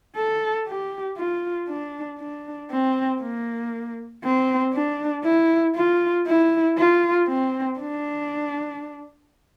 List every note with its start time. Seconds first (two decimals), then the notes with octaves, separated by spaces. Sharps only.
0.16 A4
0.67 G4
1.17 F4
1.68 D4
2.19 D4
2.71 C4
3.21 A#3
4.24 C4
4.74 D4
5.24 E4
5.75 F4
6.27 E4
6.77 F4
7.28 C4
7.79 D4